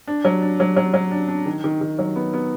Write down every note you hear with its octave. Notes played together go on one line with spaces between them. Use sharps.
D4
F#3
D4
F#3
F#3
F#3
D4
D4
D#3
D#3
D#3
F#3
B3
B3